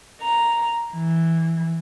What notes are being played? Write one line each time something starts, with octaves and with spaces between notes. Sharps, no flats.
A#5
E3